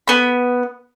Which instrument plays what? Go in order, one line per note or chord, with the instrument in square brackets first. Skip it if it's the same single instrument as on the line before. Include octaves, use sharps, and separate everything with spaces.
[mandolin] B3 B5